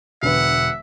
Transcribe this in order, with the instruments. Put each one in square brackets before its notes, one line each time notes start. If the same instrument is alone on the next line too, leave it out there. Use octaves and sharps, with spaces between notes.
[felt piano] E1 D3 B4 [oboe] E5 [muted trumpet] F#5